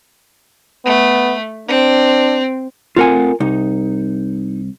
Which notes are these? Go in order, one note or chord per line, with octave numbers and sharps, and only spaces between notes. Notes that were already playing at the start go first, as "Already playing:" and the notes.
A3 B3
C4 D4
A3 C4 F4 A#4 F#5 G#5
C2 D#4